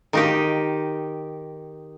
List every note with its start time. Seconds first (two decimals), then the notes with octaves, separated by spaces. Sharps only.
0.13 D#3 D#4 G4